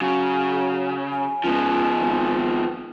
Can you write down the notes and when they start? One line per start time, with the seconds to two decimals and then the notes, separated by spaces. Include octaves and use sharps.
0.02 C#3 F#3 G#5
1.12 G#5
1.44 C#2 F3 B3
2.01 G#1